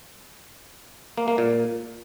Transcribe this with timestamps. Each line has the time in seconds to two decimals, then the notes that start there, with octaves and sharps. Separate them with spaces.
1.18 A#3
1.28 A#3
1.38 A#2